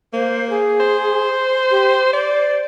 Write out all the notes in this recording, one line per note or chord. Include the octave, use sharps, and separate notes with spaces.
A#3 C5
G#4
C5
G4
C5 D5